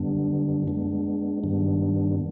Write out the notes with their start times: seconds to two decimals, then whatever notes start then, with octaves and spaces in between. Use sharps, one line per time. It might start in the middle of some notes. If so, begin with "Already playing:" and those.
Already playing: F#2 D3 G3 B3 D4
0.67 G#3 B3 D4
1.43 G2 D#3 G3 B3 D4